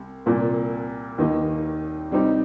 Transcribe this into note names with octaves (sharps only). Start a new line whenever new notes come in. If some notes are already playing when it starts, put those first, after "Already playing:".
Already playing: C2 C3
C2 A#2 A#3 F4
D#2 D#3 A#3 D#4
C3 G3 C4 D#4